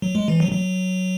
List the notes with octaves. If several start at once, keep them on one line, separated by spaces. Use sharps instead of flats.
F#3
G#3
E3
F#3
F#3